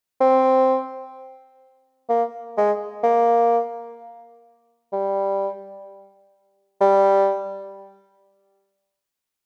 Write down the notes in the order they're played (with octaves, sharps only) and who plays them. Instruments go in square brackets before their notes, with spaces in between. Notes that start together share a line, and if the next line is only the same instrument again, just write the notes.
[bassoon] C4
A#3
G#3
A#3
G3
G3